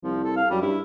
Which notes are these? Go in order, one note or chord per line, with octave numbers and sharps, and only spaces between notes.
C2 F3
A4
F5
F#2 G3
G2 E4